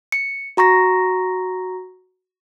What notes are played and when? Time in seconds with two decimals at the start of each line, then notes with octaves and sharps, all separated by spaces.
0.12 C#7
0.57 F#4 A#5 C#6 A#6